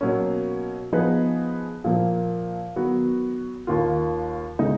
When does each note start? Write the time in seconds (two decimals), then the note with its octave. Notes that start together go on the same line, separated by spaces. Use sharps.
0.01 B2 F#3 A#3 C#4
0.92 F3 B3 D#4 G#4 B4
1.84 A#2 F3 A#3
2.76 D#3 F#3 B3 F#4
3.67 D#2 D#3 A#3 F4
4.59 C#3 G#3 D#4